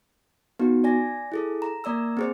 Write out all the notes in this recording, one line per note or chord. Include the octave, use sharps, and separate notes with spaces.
B3 D#4 F#4
D5 G#5 A#6
E4 G#4 A4
A#5
A#3 D5 A#5 E6
C4 G#4 C5